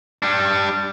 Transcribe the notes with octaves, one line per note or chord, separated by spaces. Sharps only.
G3 D4